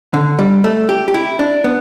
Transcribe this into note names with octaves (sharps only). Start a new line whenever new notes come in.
D3
G3
A3
G4
G4
E4
D4
B3